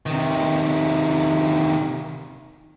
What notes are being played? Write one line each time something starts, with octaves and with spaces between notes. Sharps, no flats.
C3 D#3